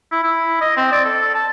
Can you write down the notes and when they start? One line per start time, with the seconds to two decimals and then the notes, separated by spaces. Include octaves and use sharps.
0.12 E4
0.23 E4
0.61 D#5
0.77 C4
0.92 D5
1.05 A4
1.34 A5